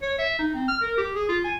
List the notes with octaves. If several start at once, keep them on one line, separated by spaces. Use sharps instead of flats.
C#5
E5
D#4
C4
F6
A#4
G4
G#4
F4
G#5